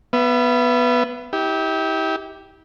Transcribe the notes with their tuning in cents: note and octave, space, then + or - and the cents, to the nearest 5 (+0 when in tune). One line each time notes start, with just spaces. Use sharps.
B3 +0 E5 +40
E4 -40 G4 +0